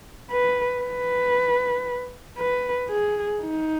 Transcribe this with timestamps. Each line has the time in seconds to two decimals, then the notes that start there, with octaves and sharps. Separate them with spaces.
0.31 B4
0.83 B4
2.38 B4
2.89 G#4
3.42 D#4